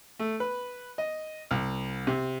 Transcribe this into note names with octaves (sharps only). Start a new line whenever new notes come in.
A3
B4
D#5
C2
C3